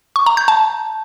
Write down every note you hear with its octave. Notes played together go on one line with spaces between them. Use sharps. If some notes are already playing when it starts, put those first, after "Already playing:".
C#6
A#5
G6
A5